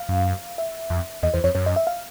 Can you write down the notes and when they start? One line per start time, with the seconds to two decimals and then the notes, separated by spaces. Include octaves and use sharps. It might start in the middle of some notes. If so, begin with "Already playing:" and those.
Already playing: F5
0.09 F#2
0.58 E5
0.90 F2
1.23 E2 D#5
1.34 E2 C5
1.44 F2 C#5
1.55 F#2 C#5
1.66 D#5
1.76 E5
1.87 F5